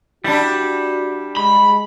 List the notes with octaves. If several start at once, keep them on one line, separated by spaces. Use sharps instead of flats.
G3 D4 E4 F#4
G#3 B5